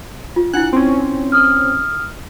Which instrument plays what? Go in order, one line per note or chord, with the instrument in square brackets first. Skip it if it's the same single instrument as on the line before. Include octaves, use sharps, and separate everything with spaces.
[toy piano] F4
[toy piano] D4 E4 [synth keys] F#5 F#6
[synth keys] C4 C#4
[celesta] D#6 F6